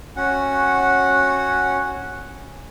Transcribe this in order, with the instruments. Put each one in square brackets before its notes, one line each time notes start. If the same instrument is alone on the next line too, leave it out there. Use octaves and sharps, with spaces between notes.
[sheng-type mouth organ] C#4 F#4 F#5